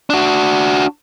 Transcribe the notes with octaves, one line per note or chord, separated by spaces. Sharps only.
D4 F#4